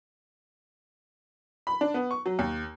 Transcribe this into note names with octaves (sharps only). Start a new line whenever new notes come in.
B5
D4
B3
C#6
F#3
D#2